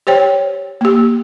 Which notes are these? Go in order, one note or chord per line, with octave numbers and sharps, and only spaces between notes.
G4 C5 C#5 G5
A#3 G4